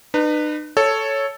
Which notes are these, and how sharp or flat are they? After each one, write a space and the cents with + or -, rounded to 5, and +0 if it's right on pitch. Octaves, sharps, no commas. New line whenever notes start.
D#4 -45 B4 +0
A4 +0 C#5 +0